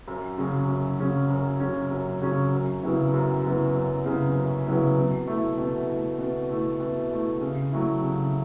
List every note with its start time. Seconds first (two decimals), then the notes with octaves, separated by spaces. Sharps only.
0.08 F#2
0.38 C#3 F#3 C#4
0.68 F#2
0.99 C#3 F#3 C#4
1.30 F#2
1.60 C#3 F#3 C#4
1.91 F#2
2.21 C#3 F#3 C#4
2.53 F#2
2.83 C#3 F#3 B3 E4
3.13 F#2
3.44 C#3 F#3 B3 E4
3.74 F#2
4.05 C#3 F#3 B3 E4
4.35 F#2
4.66 C#3 F#3 B3 E4
4.97 B2
5.28 A3 E4
5.58 B2
5.88 A3 E4
6.19 B2
6.50 A3 E4
6.80 B2
7.11 A3 E4
7.41 C#3
7.72 F#3 A3 E4
8.02 C#3